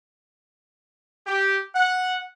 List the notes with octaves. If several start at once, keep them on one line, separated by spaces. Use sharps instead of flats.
G4
F#5